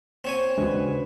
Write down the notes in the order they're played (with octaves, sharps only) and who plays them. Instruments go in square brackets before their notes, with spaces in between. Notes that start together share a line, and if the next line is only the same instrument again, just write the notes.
[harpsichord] C4 C#5 G#5
[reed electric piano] D#2 C#3 G#3 [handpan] D4 F#4 [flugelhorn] B4